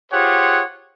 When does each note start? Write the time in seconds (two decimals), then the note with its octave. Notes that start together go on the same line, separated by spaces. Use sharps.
0.12 F4 G4 G#4 C5 C#5 F#5